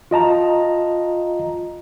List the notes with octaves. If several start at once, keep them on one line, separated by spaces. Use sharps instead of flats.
F4 D#5 A5 A#5